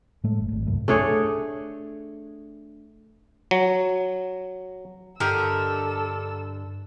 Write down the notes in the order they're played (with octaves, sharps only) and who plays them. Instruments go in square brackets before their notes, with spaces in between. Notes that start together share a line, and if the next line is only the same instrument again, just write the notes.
[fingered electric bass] A2 G#3 A3
F#1
G#1
C2 F#2 A2
[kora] A3 D4 G#4 C#5
[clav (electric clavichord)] F#3
[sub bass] G2 [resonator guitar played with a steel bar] D3 G4 D#5 [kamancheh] A4 E6 [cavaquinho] A#4